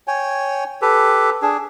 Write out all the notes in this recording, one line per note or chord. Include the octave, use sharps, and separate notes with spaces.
C#5 G5 G#5
G4 A4 B4
D4 G#4